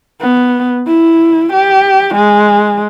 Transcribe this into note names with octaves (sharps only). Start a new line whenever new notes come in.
B3
E4
G4
G#3